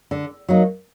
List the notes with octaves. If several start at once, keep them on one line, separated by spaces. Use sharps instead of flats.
D3
F#3 A#3 D#4